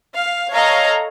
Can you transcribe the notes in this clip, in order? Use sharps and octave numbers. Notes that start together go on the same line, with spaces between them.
F5
A4 C#5 D#5 F5 A#5